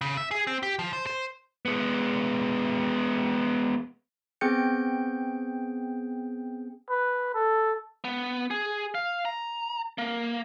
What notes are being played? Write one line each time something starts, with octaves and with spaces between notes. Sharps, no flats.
C#3
E5
G#4
C4
G4
F3
C5
C5
G#3 B3
B3 C4 G#4 G5 G6 C#7
B4
A4
B3
G#4
F5
A#5
A#3